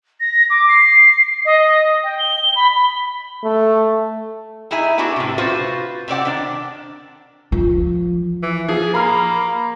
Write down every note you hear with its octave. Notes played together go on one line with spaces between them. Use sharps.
A#6
D6
C7
D#5
G5
G7
B5
B5
A3
D#4 E4 G#4 E5 G#5
B3 D4 E4 F#4 G4
A2 C3
F4 F#4 B4 C5 F5
C3 C4 D5 F#5
D#3 D4
F3
E3
F3 G#4
A#3 A#5 B5 F6